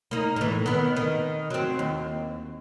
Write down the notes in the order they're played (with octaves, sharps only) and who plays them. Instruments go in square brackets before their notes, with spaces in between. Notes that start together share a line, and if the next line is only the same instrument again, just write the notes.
[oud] A#3 D#4
A2 E3
D#3 B3
D#3
F#3 C4
D#2